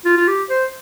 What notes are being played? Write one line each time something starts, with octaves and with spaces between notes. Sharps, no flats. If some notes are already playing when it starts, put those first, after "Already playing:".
F4
F4
G4
C5